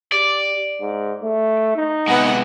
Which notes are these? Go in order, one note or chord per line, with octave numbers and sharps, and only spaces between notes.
G4 D5
G#2
A3
D#4
C3 G#3 B3 F#5